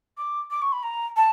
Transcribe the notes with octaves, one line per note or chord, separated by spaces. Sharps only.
D6
D6
C#6
B5
A#5
A5